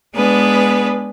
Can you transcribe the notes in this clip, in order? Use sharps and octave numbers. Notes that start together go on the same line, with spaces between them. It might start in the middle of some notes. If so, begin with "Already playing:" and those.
G#3 B3 D4 G#4 B4